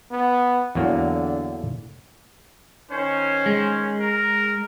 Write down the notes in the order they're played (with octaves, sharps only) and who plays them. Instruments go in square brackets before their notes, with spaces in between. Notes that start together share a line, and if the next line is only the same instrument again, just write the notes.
[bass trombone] B3
[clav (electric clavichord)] E2 F#3 A#3 [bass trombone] D3
[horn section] D#3 C#4 [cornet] C5
[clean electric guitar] G#3
[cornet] A#4